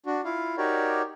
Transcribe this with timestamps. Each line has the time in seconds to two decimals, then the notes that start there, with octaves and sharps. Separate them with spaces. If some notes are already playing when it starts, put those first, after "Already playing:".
0.06 D4 F#4
0.25 E4 F4 F5
0.58 D#4 F#4 G4 A#4 C#5 D5